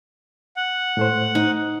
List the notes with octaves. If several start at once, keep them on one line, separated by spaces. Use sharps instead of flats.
F#5
A2 A3 C5
D#4